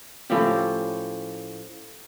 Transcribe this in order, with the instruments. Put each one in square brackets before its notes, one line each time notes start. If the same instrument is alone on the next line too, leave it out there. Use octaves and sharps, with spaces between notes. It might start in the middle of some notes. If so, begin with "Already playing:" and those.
[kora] A2 F3 C#4 G4